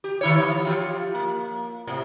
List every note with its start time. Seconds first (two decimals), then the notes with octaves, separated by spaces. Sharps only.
0.04 G4
0.21 D#3 E4 C#5
0.40 E3
0.65 F3 F4 G4
1.15 A#3
1.87 A2 C3